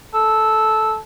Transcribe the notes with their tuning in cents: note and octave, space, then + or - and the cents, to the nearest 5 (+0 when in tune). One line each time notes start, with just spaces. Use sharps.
A4 -10